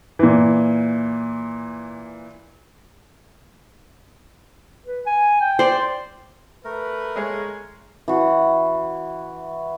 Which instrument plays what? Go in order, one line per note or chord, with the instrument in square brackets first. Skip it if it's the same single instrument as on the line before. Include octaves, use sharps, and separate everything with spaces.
[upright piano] A#2 E3
[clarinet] B4
G#5
G5
[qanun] C5 D5
[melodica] A3 A#4 [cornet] B4
[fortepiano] G#3 G#4 C#5
[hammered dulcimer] E3 F#4